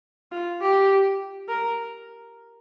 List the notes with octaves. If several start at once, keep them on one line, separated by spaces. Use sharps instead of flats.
F4
G4
A#4